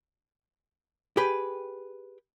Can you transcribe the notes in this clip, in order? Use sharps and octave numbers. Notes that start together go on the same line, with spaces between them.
G4 G#4 B4 G5